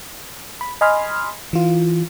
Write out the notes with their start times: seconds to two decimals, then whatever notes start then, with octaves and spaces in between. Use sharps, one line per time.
0.61 B5
0.81 D#5 G#5 B5 C6 F6
1.53 E3 F4